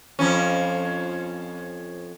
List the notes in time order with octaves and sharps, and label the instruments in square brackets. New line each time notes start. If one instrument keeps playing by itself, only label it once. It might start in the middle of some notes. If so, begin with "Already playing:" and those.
[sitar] F2 F3 C#4